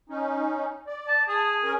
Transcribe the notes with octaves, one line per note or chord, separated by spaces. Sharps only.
C#4 D#4
D5
A5
G#4 A5 D#6
C#4 A#4 G#5